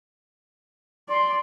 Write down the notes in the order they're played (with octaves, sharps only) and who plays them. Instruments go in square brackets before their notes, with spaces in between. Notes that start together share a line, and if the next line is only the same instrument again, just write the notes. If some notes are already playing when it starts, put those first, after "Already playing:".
[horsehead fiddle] D5 [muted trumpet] C6